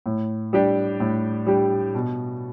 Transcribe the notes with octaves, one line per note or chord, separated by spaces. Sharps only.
A2
G3 D4 G4
A2
G3 D4 G4
B2